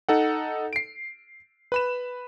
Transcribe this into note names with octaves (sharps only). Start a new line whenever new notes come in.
D#4 A4 F#5
C7 D7
B4 B5 E7